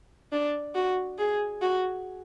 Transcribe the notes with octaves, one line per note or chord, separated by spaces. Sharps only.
D4
F#4
G#4
F#4